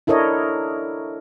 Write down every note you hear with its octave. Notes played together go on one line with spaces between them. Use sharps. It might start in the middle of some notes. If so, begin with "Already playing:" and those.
D4 E4 A4 A#4 C#5 D#5